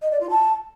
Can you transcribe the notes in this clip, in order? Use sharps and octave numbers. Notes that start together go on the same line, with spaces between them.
D#5
D5
F4
A5